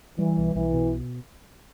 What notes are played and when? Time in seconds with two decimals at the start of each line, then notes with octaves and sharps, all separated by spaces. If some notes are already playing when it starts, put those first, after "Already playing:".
0.19 E3 G3
0.37 B1
0.55 B1 E3
0.74 B2